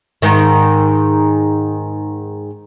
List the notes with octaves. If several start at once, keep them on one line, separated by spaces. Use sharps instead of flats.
G#2 D#3